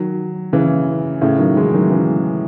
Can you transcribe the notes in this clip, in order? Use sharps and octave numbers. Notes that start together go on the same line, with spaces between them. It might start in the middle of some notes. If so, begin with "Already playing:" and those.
Already playing: D#3 F#3
C#3 E3
A2 C#3
D#3 F#3
E3 G#3
D#3 F#3
C#3 E3